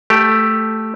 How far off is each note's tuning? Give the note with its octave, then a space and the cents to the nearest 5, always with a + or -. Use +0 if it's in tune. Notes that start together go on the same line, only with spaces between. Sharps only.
A3 +0 G4 +0